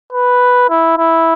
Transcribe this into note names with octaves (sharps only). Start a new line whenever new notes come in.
B4
E4
E4